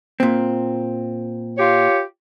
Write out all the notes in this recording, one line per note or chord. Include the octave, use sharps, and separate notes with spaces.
A#2 C4
F4 G4 C#5